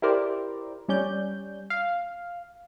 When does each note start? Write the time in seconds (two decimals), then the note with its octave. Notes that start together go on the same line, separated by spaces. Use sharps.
0.02 E4 G4 A#4 C5 D5
0.88 G3 C#4 D5 G6
1.70 F5